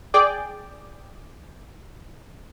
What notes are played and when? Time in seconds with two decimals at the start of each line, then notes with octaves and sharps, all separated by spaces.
0.14 G#4 D5 G5 D6